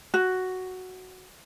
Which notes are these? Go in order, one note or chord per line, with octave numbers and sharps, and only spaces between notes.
F#4